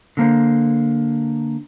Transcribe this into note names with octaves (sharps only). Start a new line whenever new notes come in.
D3 A#3 C5